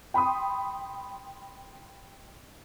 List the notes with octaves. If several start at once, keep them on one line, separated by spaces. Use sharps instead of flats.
G5 B5 C6 D#6